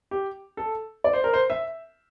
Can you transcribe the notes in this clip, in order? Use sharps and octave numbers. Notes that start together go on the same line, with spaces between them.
G4
A4
D5
C5
A#4
C5
E5